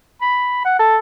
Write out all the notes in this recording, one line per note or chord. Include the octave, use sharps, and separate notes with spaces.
B5
F#5
A4